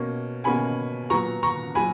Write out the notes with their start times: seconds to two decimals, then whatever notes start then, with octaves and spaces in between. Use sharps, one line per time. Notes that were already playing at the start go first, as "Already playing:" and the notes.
Already playing: B2 A#3 C#4
0.44 B2 A#3 C#4 G#5 B5
1.10 A#2 F#3 B3 A#5 C#6
1.43 A#5 C#6
1.75 A#2 F#3 G#5 B5